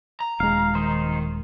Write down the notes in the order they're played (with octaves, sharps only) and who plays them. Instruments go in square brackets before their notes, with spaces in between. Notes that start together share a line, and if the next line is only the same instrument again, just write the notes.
[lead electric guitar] A#5
[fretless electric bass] D#1 G#3 [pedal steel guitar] F5
[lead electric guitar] D#3 [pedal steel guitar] D#4 C5